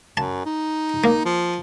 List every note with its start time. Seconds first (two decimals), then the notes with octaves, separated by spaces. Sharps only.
0.17 F#2 A5
0.46 D#4
1.04 A#3
1.25 F3